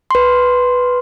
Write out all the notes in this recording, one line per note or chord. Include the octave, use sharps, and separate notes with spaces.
B4 C6